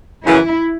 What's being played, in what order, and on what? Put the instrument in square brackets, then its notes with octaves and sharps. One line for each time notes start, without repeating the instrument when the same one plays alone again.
[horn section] F#2 C#3 E3 [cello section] E4